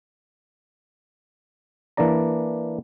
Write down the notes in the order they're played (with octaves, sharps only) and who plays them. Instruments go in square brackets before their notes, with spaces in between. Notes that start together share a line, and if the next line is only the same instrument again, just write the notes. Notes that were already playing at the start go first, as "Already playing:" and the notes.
[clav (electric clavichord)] E3 A#3 D4 D5 A#5